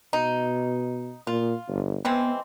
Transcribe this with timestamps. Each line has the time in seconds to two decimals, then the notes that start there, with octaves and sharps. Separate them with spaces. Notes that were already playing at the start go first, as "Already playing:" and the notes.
0.13 B2 D#4
1.27 A#2 F4
1.68 G1
2.05 E3 G#3 B3 C4